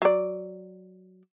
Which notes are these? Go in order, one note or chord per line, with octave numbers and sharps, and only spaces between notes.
F#3 D5